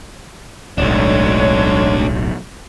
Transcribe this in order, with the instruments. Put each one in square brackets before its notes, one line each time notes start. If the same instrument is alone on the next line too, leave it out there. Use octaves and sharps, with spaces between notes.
[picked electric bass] D1 B1 [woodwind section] F#3 G#3 C#5 [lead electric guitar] A3 D4